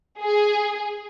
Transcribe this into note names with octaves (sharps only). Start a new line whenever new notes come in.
G#4